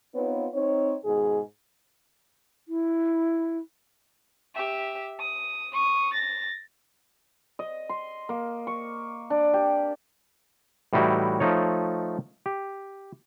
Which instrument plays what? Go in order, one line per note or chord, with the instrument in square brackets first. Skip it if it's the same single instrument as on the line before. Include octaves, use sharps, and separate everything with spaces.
[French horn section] B3 C4 D#4 F4 B4 C#5
C4 D#4 C#5
G#2 B2 D#3 G#4
[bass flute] E4
[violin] G4 E5
D#6
C#6 D#6
A6 A#6
[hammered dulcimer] D#5
C6
A#3
C#6
D4
G4
[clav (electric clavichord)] A2 E3 G3 D#4 E4 F#4
F3 A3 D#4 C#5
G4